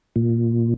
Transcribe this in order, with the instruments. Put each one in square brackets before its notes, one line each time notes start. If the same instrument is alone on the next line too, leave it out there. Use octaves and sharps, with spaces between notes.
[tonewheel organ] A#2